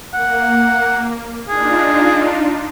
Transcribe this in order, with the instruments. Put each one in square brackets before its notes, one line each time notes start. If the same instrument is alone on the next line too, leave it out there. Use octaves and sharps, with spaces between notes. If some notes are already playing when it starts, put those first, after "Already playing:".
[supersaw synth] A#3 [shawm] F#5
[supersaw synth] D4 D#4 F4 [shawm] G#4